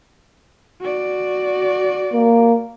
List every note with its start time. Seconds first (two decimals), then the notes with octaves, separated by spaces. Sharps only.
0.81 F#4 D5
2.13 A#3